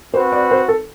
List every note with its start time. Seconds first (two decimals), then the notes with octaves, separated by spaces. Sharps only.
0.14 C4 F#4 B4 C5
0.32 D5
0.51 C5
0.68 A4